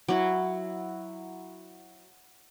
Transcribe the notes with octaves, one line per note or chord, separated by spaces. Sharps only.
F#3 E4